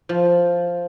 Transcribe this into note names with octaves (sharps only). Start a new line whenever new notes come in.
F3